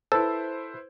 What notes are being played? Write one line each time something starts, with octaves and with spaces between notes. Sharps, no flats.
E4 A4 B4 C5